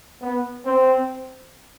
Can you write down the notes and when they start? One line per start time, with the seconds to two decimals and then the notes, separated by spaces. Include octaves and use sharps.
0.21 B3
0.66 C4